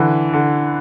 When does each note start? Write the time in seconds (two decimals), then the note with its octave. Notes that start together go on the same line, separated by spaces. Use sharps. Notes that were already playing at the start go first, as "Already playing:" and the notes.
Already playing: D3 E3
0.33 D3